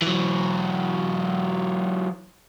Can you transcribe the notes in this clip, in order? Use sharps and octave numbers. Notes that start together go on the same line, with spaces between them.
E3 F#3